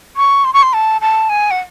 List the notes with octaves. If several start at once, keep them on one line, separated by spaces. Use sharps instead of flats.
C#6
C6
C#6
C6
A5
A5
G#5
F#5